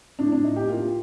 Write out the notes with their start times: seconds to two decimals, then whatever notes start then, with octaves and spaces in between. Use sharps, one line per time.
0.19 A2 D4
0.32 D4
0.44 A2 D#4
0.56 G4
0.69 A#3 F4